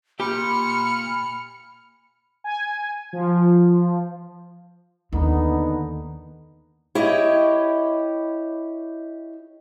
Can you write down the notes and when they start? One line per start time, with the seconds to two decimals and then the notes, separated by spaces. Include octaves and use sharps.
0.20 A#2 G4 B5 F6 C#7
2.44 G#5
3.13 F3
5.13 D#2 D3 B3 D#4
6.95 E4 G4 C#5 D#5